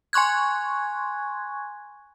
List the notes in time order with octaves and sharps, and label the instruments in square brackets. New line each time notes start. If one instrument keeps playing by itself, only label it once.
[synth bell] G#5 C6 C#6 F#6 G#6